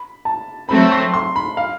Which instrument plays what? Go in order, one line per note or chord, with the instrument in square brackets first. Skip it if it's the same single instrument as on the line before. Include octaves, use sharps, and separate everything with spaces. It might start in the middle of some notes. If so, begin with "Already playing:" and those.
Already playing: [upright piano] B5
A5
[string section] F#3 A3 C4 [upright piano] B5
[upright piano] C6
C6
B5
F5